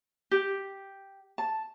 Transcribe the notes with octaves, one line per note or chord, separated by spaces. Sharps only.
G4
A5